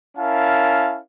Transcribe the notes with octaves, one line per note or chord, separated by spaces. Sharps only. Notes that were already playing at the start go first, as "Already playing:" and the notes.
C#4 E4 A#4 F5 A5